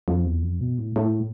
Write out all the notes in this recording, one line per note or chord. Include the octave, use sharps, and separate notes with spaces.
F2
E2
F2
B2
A2
A2